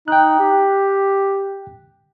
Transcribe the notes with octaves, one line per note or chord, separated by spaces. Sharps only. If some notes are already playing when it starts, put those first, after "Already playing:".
D#4 G5 F#6
G4